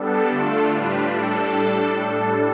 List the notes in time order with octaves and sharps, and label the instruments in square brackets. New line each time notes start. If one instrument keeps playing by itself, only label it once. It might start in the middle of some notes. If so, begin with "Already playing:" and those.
Already playing: [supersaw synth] G3 B3 D4 A4
D3 A3 D4 F4 A4
A2 G3 D4 F4 B4
A2 G3 D4 A4